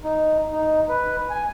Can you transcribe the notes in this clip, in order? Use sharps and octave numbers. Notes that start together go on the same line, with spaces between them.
D#4
D#4
B4
G#5